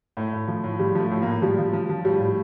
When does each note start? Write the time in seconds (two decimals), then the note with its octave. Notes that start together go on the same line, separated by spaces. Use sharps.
0.17 A2 A3
0.33 A2
0.48 F3
0.64 A2
0.80 F3 G3
0.95 F3
1.00 A3
1.11 A2
1.22 A2 A#3
1.42 F3 G3
1.58 F3
1.73 F3
1.89 F3
2.05 A2 G3
2.20 A2